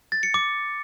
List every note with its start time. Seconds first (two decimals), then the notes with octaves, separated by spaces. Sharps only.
0.12 A6
0.23 C#7
0.34 D6